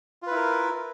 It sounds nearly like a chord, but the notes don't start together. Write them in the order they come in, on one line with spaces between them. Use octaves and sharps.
F4 B4 E4 A#4